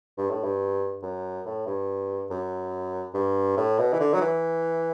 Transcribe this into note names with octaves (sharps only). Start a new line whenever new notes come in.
G2
A2
G2
F#2
A2
G2
F#2
G2
A2
B2
E3
D3
F#3
E3